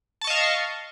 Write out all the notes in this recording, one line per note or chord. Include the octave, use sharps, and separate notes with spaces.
D#5 F5 A5 C#6